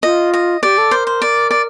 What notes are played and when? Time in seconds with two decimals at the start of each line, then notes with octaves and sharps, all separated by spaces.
0.03 F4 D#5
0.34 D#5
0.63 G4 D5
0.78 A4
0.91 A#4 C5
1.07 C5
1.22 D5
1.51 D5